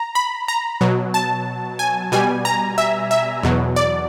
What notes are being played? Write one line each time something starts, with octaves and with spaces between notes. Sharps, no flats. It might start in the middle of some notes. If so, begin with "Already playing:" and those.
Already playing: A#5
B5
A#5
B2 F#3
A5
G#5
B2 G3 G#5
A#5
E5
E5
E2 B2 F#3
D5